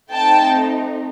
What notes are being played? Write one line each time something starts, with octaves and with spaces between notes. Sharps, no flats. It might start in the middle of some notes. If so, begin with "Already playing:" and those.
A3 C4 D#4 G5 A5